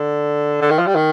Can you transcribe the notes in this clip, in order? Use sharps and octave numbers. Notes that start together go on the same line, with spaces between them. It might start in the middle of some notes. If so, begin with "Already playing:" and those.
Already playing: D3
D3
D#3
F3
G3
D#3